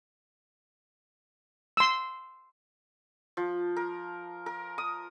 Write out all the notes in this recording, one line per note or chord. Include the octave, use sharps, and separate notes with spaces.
C6 E6
F3
A#4
A#4
D#6